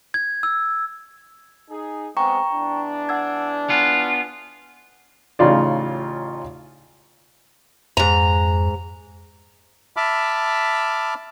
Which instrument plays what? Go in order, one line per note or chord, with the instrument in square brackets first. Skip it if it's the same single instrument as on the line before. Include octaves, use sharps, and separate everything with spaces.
[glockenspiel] G#6
E6
[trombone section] D#4 G#4
[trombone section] G#3 B3 C4 [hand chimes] G5 A#5 C#6
[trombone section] E2 D4
[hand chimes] F#5 E6 G#6
[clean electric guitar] B3 F4 [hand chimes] G#5
[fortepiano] A1 C#3 D#4 F4 D5
[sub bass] F2 [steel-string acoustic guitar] G#2 A#5
[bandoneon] E5 A5 B5 D6 F6